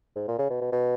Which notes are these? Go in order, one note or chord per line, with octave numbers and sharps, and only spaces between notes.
G#2
A#2
C#3
B2
B2
B2